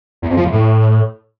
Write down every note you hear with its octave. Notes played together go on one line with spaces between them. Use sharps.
E2
F2
F3
E2
A2